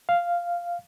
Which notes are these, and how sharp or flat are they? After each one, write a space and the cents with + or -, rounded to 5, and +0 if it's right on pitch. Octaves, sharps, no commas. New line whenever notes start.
F5 -5